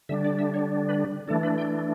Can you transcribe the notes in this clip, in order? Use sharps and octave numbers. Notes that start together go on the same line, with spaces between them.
D3 G3 D4 E5
D5
E5
C#5
B4
E3 A3 D4 A4
B4
G5